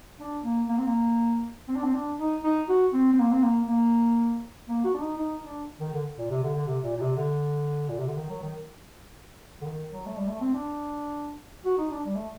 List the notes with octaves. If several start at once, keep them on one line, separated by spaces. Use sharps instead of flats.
D4
A#3
A#3
C4
A#3
C4
D4
C4
D4
D#4
D#4
F#4
C4
C4
A#3
C4
A#3
A#3
A#3
F#4
D4
D#4
D#4
D4
D#3
D3
A#2
C3
D3
D3
C3
A#2
A#2
C3
D3
A#2
C3
D3
D#3
F#3
D#3
D3
D#3
F#3
A3
G3
A3
C4
D4
F#4
D#4
D4
G3
A3